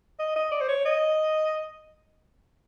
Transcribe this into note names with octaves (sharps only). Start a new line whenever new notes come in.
D#5
D#5
D5
C5
C#5
D#5